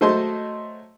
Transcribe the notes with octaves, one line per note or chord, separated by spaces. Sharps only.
F#3 A3 C5 D#5 A5 C6